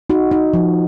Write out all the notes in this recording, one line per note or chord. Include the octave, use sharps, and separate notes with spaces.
D#4 F#4
D#4
F3